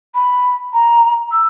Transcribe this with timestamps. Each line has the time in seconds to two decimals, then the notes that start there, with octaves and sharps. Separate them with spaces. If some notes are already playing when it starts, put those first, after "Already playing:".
0.15 B5
0.73 A#5
1.31 E6